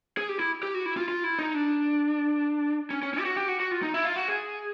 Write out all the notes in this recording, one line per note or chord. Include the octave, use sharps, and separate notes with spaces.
G#4
G4
E4
G4
F#4
E4
F4
F4
E4
D#4
D4
C#4
C#4
C#4
G4
F#4
G4
F#4
F#4
F4
D#4
E4
F4
F#4
G#4